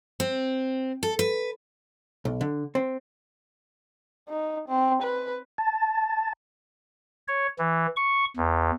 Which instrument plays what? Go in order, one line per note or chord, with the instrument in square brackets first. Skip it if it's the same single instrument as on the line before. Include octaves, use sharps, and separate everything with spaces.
[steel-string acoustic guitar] C4
A4
B4
[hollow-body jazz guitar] B1
D3
C4
[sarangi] D#4
C4
B4
[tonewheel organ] A5
[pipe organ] C#5
E3
C#6
E2